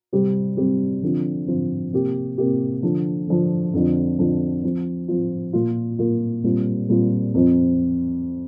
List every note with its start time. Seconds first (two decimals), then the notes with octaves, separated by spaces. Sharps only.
0.13 C3 G3 C4 G4
0.57 C3 G3 C4 G4
1.03 D3 F3 C4 F4
1.48 D3 F3 C4 F4
1.93 C3 A#3 G4
2.38 C3 A#3 G4
2.83 D3 F3 D4
3.28 D3 F3 D4
3.74 F2 D3 F3
4.19 F2 D3 F3
4.64 F3 C4 F4
5.08 F3 C4 F4
5.53 A#2 A#3 F4
5.99 A#2 A#3 F4
6.44 A#2 G3 C4 F4
6.89 A#2 G3 C4 F4
7.34 F2 F3 C4